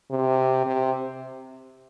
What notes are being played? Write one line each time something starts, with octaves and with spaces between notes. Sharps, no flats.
C3
C3